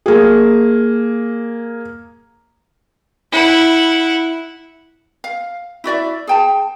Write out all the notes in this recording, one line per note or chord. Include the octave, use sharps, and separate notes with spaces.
A#3 G#4
E4 F#5
F5
E4 F#4 D5 E5
G#4 G5 A5